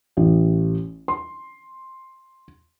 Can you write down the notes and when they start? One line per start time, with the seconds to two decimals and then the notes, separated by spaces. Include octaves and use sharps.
0.17 A1
1.08 C6